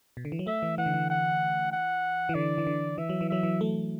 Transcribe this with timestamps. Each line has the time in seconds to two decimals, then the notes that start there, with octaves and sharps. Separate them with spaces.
0.17 B2
0.25 D3
0.32 E3
0.39 F#3
0.47 A3 E5
0.63 E3
0.78 E3 F#5
0.86 D3
0.94 E3
1.10 F#5
1.72 F#5
2.29 E3
2.35 D3 D5
2.58 E3
2.67 D3
2.98 E3 E5
3.09 F#3
3.21 E3
3.29 F#3 E5
3.43 E3
3.61 A3